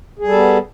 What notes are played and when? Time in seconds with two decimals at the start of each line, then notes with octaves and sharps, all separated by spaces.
0.19 G#4
0.24 G3
0.29 A4
0.33 B3